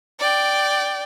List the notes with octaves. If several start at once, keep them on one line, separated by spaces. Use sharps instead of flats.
D5 G5